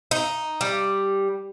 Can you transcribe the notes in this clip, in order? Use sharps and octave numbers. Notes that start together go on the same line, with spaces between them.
D#4
G3